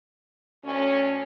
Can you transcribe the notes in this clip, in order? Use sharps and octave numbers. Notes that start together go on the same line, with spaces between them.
D2 C#4